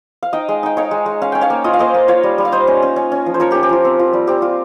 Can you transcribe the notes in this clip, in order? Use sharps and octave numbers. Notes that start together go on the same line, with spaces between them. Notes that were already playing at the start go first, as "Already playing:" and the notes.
F5
D#4 D#5 G5
G#3
D#4 G5
D#4 C#5 F5
G#3
G#3
C#4 F5
C#4 G5
C#5 F5
A#3
F4 D#5
F5
A#3 C5 D#5
A#3
F4 C#5 F5
G3
G3
F5
G3 C5 D#5
C#4
C#4
C#4
C#4
F3
C5
F3 A#4 C#5
C#4 G4 A#4
G4
F3 F4
C4
F4
G3
C4 G4
F4